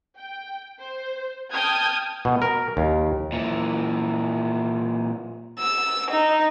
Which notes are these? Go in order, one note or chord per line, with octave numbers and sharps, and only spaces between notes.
G5
C5
G5 A5 D#6 F6 G6 G#6
B2
A#4
D#2
A#2 E3
E6
D#4